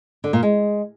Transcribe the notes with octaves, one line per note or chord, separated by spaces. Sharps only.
D3
A#2
G#3